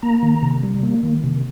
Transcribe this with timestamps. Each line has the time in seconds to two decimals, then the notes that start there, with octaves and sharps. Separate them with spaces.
0.03 A#3 A#5
0.23 D#3
0.42 C3
0.63 G3
0.83 A#3
1.03 D#3
1.24 C3